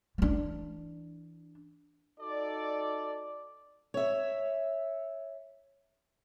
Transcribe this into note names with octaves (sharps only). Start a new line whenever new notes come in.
E3 D4
D#4 F#4 A4 D5
C#5 E5